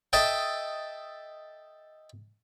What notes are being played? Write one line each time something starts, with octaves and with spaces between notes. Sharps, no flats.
A4 D#5 E5 G5